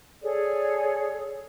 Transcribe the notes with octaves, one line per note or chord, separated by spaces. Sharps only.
G#4 A4 C#5 D5